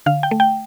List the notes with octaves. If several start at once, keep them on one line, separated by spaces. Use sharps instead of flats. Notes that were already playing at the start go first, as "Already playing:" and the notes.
D3 F5
G5
A3
G5